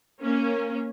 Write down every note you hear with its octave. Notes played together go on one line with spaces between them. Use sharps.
A#3 C#4